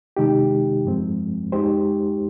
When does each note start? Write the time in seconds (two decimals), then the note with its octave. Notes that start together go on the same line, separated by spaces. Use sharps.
0.17 C3 D#3 G#3 D#4 G4
0.85 G2 F3 G#3 C4
1.52 G#3 D#4 G4 C5